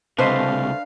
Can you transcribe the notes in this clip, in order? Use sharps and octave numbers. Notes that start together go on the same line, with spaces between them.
C#2 C3 A3 D4 B4 C5 D#5 F5